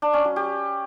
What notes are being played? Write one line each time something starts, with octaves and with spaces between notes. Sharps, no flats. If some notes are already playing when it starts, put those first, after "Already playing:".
D4
C#4
F#3
G4